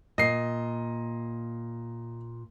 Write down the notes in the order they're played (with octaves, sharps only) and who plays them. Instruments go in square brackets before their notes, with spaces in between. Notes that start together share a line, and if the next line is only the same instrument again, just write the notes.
[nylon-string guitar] A#2 [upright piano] D#5 C7